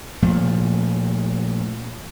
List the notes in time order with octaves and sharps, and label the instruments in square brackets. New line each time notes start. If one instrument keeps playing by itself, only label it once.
[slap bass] A#2 F3 A3